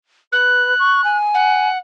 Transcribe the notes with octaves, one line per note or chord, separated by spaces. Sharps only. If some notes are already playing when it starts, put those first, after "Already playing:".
B4 F#6
C#6
G#5
F#5